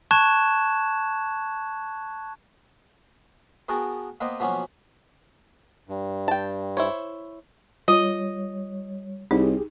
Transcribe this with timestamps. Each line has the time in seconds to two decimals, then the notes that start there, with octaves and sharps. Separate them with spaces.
0.11 A5 C#6 F#6 G#6 E7
3.69 B3 F#4 G#4 A#4 G5 A5
4.21 A#3 B3 B4 C5 D#5 G5
4.40 B2 F3 F#3 A#3 B3 C#4
5.89 G2
6.28 G5 A5
6.77 E4 C5 C#5
7.88 G3 F4 C#5 D#5
9.31 C2 D#4 G4 G#4